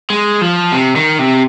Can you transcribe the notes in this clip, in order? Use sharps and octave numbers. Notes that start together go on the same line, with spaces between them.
G#3
F3
C3
D#3
C3